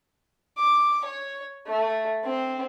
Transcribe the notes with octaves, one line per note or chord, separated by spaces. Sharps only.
D6
C#5
A3
C4